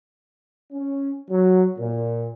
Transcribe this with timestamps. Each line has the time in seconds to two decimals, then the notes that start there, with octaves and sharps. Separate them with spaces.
0.73 C#4
1.31 F#3
1.79 A#2